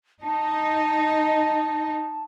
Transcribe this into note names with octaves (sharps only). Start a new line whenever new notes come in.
D#4 A5